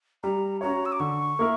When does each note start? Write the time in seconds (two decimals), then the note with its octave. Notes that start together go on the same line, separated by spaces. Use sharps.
0.23 G3 A#5
0.61 C#4 F#4 C#5 A#5
0.86 E6
0.92 D6
1.00 D3 C#6
1.39 A#3 E4 A#4